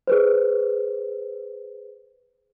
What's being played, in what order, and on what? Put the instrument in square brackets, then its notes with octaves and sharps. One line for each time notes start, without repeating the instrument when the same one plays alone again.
[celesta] G#4 B4 C5